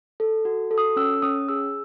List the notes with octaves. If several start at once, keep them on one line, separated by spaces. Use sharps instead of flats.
A4
F#4
A4
D#6
C#4 E6
C#4 D#6
G#4 E6